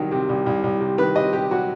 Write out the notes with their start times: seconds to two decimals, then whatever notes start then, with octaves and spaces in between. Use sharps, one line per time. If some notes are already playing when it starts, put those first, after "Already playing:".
Already playing: C2 D#3 F#3
0.11 C3
0.29 C2
0.46 C2
0.64 C2
0.81 C3
0.98 D#3 B4
1.16 C3 D#5
1.33 C3 G4
1.51 F#3 F#4